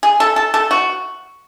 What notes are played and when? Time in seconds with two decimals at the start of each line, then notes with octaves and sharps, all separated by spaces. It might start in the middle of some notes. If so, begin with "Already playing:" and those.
0.03 G#4
0.20 A4
0.36 A4
0.54 A4
0.71 F#4